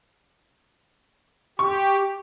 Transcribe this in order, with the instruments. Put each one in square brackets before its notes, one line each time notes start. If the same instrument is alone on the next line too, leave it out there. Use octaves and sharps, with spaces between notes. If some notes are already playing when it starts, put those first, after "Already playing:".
[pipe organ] G4 [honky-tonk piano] C#6